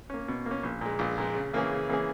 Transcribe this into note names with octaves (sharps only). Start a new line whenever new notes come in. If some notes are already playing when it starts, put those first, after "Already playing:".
A#3 C#4
B2
A#3
C#4
A#1
A#2 G#3
A#1
A#2 G#3
C#3
E3 A#3 C#4 G#4
C#3
E3 A#3 C#4 G#4